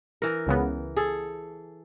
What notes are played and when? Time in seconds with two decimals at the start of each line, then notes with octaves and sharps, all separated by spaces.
0.22 E3 A#4
0.47 C#2 C#3 B3
0.96 G#4 A4